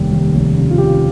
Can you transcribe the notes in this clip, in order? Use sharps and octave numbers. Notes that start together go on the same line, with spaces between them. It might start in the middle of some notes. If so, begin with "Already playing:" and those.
Already playing: F1 D#2 G3
D#2
F1
C#3
F4
C#3 G4